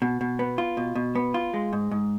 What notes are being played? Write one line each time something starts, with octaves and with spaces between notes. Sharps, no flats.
B2
B2
B3
F4
B2
B2
B3
F4
G#3
G#2
G#2